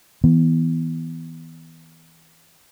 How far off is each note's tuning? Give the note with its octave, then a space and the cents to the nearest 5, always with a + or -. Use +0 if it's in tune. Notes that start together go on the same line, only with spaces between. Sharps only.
E3 -25 B3 +0